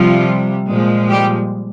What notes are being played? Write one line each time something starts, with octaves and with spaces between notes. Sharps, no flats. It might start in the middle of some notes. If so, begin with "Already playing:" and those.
Already playing: C3 F3 G3 F4
A#2 F3 G#3
G3 G4